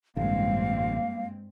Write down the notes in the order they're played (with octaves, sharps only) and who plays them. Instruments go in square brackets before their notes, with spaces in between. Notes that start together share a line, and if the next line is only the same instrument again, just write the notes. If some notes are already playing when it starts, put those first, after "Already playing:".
[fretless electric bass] A1 D3 [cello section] G2 G#3 C4 [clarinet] A#3 [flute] F5